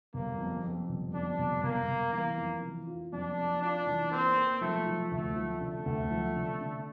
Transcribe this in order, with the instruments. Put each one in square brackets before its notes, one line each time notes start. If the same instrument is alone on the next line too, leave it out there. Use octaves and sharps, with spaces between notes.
[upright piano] G1 [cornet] A#3
[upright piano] F2
F2
G1
[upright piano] F2 [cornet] D4
[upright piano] G1
[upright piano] G1 [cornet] A#3
[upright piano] G1
[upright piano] E3 [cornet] A#3
[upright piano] F2
E3
F4
[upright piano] F2 [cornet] D4
[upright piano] F2
[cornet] D4 [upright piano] F4
[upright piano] E3
[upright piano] A#3 [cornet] C4
[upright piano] A#3
[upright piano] F3 [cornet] A3
[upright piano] F3
[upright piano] D2 [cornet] A3
[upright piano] F3
[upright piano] D3 [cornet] A3
[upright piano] D2
F3
D3
D3